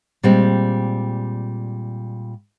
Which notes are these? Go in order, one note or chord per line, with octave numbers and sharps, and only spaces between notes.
A#2 G3 G#3 C4